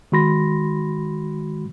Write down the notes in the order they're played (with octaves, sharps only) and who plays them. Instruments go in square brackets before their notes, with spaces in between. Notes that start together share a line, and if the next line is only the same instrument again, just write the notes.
[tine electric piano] D#3 G#3 F#4 B5 C6 A#6